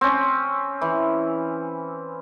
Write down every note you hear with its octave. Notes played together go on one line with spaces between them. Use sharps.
C4 C#4
E3